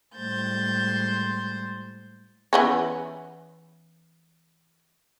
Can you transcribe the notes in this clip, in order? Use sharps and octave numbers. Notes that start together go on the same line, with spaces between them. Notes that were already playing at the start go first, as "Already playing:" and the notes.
A2 G3 G#3 C5 G6 A6
E3 B3 C#4